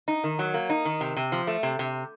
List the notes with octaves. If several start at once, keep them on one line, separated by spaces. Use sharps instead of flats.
D#4
D#3
F#3
A#3
D#4
D#3
C3
C3
F3
A3
C3
C3